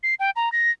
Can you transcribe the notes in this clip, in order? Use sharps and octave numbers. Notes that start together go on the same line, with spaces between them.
C7
G5
A#5
A#6